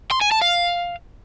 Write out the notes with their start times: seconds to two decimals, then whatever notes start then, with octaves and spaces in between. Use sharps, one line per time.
0.11 C6
0.21 G#5
0.31 A5
0.42 F5